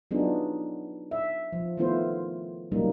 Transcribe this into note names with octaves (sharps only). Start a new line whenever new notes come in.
F#3 B3 D4 D#4 F4 G#4
E5
F3
D#3 A3 B3 E4 F4 C5
C#3 F#3 G3 A#3 D#4